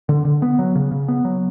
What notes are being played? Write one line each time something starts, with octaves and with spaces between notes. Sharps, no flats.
D3
D3
B3
F#3
C#3
C#3
B3
F#3